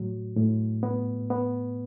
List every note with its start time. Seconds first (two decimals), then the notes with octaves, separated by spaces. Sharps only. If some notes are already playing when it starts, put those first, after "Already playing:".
Already playing: A2 F#3
0.36 A2
0.83 B3
1.30 B3